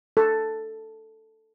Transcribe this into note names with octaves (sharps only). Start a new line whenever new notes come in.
A4